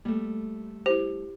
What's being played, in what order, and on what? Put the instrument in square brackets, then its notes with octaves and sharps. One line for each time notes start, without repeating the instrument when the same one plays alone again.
[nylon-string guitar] G3 A3 [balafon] A#3
[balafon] E4 C5 [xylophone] G4